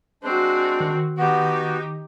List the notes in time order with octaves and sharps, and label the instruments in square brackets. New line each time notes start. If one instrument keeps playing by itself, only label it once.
[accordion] G#3 D4 [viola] C4 F#4
[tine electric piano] D#3
[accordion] B3 F#4 [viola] D#4 G4